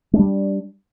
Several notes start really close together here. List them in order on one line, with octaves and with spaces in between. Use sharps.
G#3 D4 G3